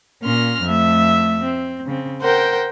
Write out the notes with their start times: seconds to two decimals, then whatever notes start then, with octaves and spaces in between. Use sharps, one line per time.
0.22 A#2 C#4 C6 F6 A#6
0.62 F2 A3 E5
1.43 C4
1.86 C#3 C4
2.22 A#4 C5 F#5 G5